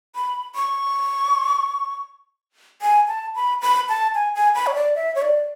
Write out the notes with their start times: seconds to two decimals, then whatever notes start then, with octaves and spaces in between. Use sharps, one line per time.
0.15 B5
0.55 C#6
2.82 G#5
3.08 A5
3.35 B5
3.61 B5
3.89 A5
4.15 G#5
4.35 G#5
4.55 B5
4.67 C#5
4.75 D5
4.95 E5
5.15 C#5
5.22 D5